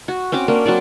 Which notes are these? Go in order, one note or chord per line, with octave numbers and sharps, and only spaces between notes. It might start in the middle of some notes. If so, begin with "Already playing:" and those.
F#4
C4 C#4 F#4 D6
A#3 C#4 D4
F#3 C4 F#4 D5